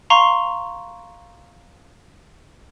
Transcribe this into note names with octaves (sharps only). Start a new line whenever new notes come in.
F5 A#5 C6 C#6